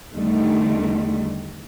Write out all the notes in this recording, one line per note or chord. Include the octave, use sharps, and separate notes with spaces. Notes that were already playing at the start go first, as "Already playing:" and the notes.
E2 D3 D#3 G3 A3